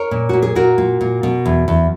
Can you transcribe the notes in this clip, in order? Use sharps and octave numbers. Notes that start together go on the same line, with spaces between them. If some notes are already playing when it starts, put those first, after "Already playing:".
Already playing: A#4 C#5
A#2
A#2 F#4
G#4
A#2 F#4 A#4
A#2
A#2
B2
E2
E2